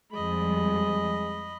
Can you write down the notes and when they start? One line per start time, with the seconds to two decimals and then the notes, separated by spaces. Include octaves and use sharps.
0.12 F2 G3 G#3 D#5 B5